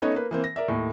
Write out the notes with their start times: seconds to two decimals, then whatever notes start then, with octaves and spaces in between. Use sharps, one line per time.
0.02 A3 B3 C#4 D#4 C#5 D#5
0.14 A#3 B4
0.31 E3 A#3 C4
0.44 A#6
0.56 A#4 D5 E5
0.68 D#2 A2